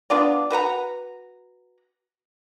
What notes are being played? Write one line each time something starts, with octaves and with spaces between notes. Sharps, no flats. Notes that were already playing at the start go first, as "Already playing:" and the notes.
B3 D4 F4 D5
F#4 B4 F#5 A#5